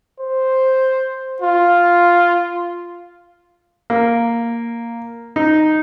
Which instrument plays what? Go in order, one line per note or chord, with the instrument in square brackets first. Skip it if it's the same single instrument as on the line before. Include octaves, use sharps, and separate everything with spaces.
[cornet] C5
F4
[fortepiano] A#3
D#4